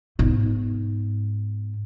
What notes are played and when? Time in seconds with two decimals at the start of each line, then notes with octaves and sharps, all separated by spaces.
0.19 G#2 B3